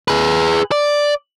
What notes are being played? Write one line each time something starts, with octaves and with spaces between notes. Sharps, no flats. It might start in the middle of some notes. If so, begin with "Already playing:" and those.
G#4 B4
D5